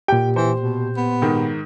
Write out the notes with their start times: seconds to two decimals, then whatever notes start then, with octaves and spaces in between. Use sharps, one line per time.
0.08 A#2 G4 G5
0.36 E3 C5
0.60 B2
0.96 B3
1.22 G#2 D#3